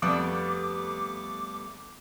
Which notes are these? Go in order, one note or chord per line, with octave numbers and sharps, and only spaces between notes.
F2 G3 A3 B3 D6